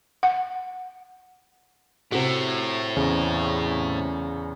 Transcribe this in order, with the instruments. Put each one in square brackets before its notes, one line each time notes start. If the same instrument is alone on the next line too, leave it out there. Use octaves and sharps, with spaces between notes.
[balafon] F#5
[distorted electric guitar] A2 [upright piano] C3 F#4
[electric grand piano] E2 C#3